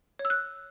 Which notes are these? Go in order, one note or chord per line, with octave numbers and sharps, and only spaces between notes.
C#5
E6
F#6